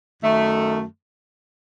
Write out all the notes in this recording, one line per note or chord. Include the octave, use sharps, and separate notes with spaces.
F#2 D#3 A3